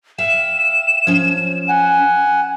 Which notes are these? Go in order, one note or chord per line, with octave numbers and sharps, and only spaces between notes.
E5 F5 G5 E7
F3 C#4
F#5 G#5